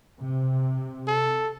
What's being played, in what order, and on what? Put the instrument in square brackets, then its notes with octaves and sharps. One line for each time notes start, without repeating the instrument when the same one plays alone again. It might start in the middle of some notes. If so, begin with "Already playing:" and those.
[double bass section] C3
[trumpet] A4